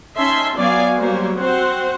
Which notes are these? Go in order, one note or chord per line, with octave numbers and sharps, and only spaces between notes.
C#4 D#4 E5 A5 C6
F#3 B3 F#4 D5 F5 G#5
F#3 G3 A#3 C5 C#5
C4 F#4 C5 F#5